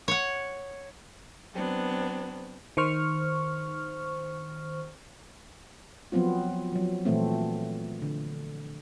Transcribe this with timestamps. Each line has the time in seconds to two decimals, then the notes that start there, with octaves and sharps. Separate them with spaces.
0.08 C#5 F#5
1.54 F#3 B3 C4 D4
2.77 D#3 C5 C#6 F6
6.12 F3 F#3 B3 C4 F4
6.72 F3 F#3
7.05 A#2 E3 A3 C4
8.02 D3